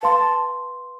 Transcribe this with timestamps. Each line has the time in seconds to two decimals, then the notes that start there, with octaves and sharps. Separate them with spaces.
0.03 B4 F5 A5 C6